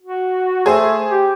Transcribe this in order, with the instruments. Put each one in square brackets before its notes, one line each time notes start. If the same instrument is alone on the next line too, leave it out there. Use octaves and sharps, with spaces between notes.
[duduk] F#4
[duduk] A3 [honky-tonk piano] G#4 C5
[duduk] G4